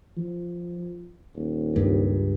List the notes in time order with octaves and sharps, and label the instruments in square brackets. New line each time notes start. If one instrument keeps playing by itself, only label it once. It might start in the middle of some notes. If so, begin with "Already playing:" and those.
[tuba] F3
D#1
[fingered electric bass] C#2 G2